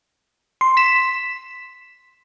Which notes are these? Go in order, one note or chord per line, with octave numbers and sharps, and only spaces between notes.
C6
B6 E7